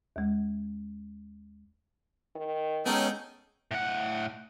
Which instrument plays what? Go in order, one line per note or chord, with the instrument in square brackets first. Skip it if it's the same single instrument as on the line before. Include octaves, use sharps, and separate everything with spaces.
[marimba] D#2 G#3
[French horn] D#3
[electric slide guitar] G#3 B3 [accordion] C#4 D#4 [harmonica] G#4 A4 G5
[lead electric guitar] A2 F#5